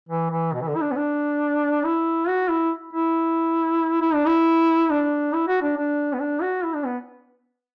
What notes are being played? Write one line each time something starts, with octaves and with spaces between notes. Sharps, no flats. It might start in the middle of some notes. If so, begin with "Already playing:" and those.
E3
E3
B2
E3
D3
E4
D4
B3
D4
E4
F#4
E4
E4
E4
D4
E4
D4
E4
F#4
D4
D4
B3
D4
F#4
E4
D4
B3